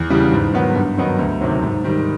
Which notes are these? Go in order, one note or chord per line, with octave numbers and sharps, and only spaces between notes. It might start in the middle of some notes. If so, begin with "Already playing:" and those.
Already playing: E2
C#3 E3 G3
G#2
D#3 F#3 B3
G2
D#3 F#3 B3 D#4
D2
C3 D#3 F#3
G#2
D#3 G3